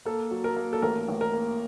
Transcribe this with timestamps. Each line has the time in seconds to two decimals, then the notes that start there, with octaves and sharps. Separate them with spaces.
0.05 A#3 A4
0.31 F#3
0.44 A#4
0.56 A#3
0.73 A4
0.82 A1 A#4
1.08 A1
1.21 A#4
1.33 A#3